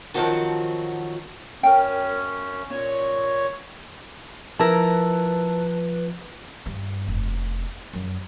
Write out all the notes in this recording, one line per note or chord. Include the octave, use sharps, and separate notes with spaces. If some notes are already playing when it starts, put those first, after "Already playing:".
D#3 F3 F#3 C4 F#4 A5
F#2 C#4 A#4 G5
A#2 C#4 C#5
F3 E4 A#4 B4 A5 E6
G2
F1
F#2